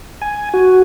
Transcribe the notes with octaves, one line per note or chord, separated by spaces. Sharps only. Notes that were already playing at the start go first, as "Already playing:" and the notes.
G#5
F#4